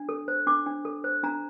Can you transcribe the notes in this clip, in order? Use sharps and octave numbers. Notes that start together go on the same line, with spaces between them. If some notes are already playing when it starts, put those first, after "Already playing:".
Already playing: D4
A4
C5
D4 D6
D4
A4
C5
D4 A#5